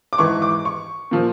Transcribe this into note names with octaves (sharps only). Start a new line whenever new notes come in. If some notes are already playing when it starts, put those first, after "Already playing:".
D6
G#2 E3 C#6
D6
C#6
A#2 F3